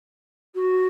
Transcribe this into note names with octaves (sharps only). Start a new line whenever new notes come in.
F#4